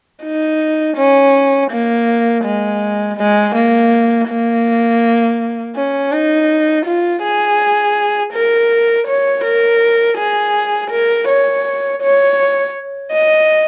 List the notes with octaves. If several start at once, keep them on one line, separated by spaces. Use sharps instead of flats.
D#4
C#4
A#3
G#3
G#3
A#3
A#3
C#4
D#4
F4
G#4
A#4
C#5
A#4
G#4
A#4
C#5
C#5
D#5